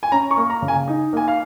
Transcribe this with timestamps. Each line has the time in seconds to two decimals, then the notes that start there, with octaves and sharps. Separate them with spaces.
0.03 G#5
0.12 C#4 A#5
0.31 C#6
0.37 A#3
0.50 A#5
0.62 C#3
0.68 G#5
0.88 D#4
1.13 A#3 G#5
1.28 F5